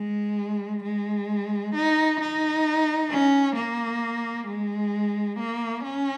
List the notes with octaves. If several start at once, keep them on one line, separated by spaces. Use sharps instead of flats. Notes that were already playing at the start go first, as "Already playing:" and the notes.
Already playing: G#3
G#3
D#4
D#4
C#4
A#3
G#3
A#3
C#4